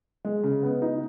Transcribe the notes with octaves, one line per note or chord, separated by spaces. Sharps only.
G#3
C#3
B3
D#4